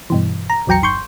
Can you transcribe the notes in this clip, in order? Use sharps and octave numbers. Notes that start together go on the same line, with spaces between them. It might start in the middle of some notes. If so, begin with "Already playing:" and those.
G2 B2 E3
A#5
A#1 E2 F#3 G5 A#5 C#7
G1 C6 C#6 G6